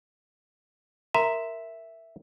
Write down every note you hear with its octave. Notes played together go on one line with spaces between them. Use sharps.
A#4 E5 A#5 C6